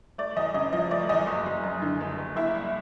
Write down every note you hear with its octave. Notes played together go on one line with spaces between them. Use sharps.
A3 D5
E2 D#5
C#3 D#5
F3 D#5
A3 D5
E2 D#5
F#1
F#1
F#2
D3
F#1
F#1
A#3 E4 E5
C2